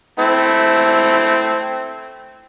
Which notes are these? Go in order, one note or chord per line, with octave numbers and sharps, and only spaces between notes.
A3 C4 E4